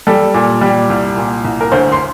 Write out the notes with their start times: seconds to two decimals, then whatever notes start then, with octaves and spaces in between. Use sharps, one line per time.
0.07 G3 A4
0.34 A#2
0.61 G3
0.90 C2
1.17 A#2
1.45 C2
1.61 A#4
1.72 D2 C5
1.92 C6